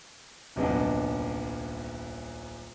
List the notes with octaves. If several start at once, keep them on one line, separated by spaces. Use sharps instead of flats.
D#1 C2 F#2 B3 D4 D#5